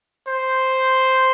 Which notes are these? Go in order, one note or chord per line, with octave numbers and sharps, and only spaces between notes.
C5